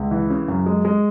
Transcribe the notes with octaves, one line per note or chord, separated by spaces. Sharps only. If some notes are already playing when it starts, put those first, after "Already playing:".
Already playing: C#2
E3
C#3
F#2
G#3
G#3